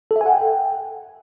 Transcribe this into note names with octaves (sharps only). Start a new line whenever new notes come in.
A4
E5
G#5
F#5
G5